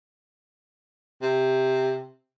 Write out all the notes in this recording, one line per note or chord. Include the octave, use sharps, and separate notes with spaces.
C3